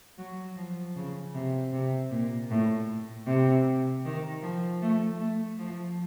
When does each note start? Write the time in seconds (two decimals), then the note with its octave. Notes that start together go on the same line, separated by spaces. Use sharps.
0.18 F#3
0.56 F3
0.96 C#3
1.34 C3
1.72 C3
2.11 A#2
2.50 A2
3.27 C3
4.05 D#3
4.43 F3
4.82 A3
5.20 A3
5.59 F3